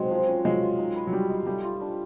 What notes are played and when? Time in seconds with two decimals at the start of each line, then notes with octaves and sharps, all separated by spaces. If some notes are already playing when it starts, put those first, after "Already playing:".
Already playing: F#3 G#3 C4 D#4
0.11 F3
0.27 C#4
0.45 F#3 G#3 A#3
0.62 F4
0.79 D#4
0.96 B4
1.07 F#3
1.13 G3 G4
1.30 D#4
1.47 G3 A3
1.64 F4
1.81 D4